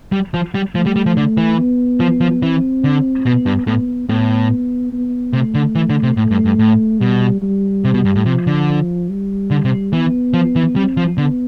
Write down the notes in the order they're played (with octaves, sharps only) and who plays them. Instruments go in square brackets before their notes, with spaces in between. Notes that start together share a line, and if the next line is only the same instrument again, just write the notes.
[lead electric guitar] G3
F3
G3
[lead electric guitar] F3 [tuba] A3
[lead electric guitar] G3
G3
F3
D3
E3
[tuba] B3
[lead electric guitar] F3
F3
[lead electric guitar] E3 [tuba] C4
[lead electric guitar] D3
[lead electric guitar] B2 [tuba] B3
[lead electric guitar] G2
[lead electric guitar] A2 [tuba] B3
[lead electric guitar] A2 [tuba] B3
[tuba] B3
[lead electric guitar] C3 [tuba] A3
[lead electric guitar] D3
E3
D3
C3
[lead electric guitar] A2 [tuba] A3
[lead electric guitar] G2
G2
A2
[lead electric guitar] B2 [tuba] G3
[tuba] G3
[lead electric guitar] C3
B2
G2
A2
[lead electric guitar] C3 [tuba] F3
[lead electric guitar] D3
[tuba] G3
[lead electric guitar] D3
C3
[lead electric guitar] E3 [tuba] B3
[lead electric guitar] F3
E3
[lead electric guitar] G3 [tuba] C4
[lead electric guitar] F3
[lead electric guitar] D3 [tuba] B3